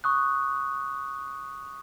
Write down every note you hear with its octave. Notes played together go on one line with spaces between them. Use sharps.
C#6 D#6 F#6